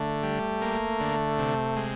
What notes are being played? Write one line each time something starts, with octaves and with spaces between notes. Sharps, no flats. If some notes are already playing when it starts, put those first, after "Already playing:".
Already playing: D3 A3
G3
A#3
D3
C3
G#3